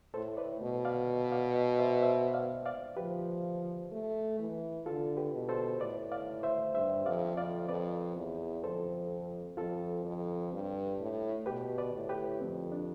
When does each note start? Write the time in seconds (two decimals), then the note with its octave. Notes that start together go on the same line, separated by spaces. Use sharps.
0.14 A2 A4 C5
0.37 B4 D5
0.61 B2
0.85 D5 F5
1.32 D5 F5
1.79 C5 E5
2.02 C5 E5
2.34 D5 F5
2.66 D5 F5
2.97 F3 G4 B4
3.91 A3
4.39 E3
4.86 D3 F4 A4
5.17 G4 B4
5.33 B2
5.49 A4 C5
5.80 A2 B4 D5
6.12 D5 F5
6.43 C5 E5
6.74 G2 C5 E5
7.06 F2 D5 F5
7.37 F2 D5 F5
7.69 F2 B4 D5
8.16 E2
8.64 F2 A4 C5
9.57 F2 F4 A4
10.05 F2
10.52 G2
11.00 A2
11.46 B2 G4 B4
11.78 B4 D5
11.93 A2
12.09 G4 B4
12.41 F2 C4
12.72 D4